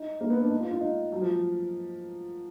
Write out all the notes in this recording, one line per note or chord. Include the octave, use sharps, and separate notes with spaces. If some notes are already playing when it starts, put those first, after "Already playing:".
Already playing: D#4
A#3
B3
D4
D#4
F4
F4
D#4
F#3
F3